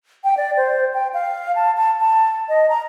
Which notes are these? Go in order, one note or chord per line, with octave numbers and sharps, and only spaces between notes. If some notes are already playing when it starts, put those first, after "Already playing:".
G5
D5
C5
G5
F5
A5
A5
A5
D#5
A#5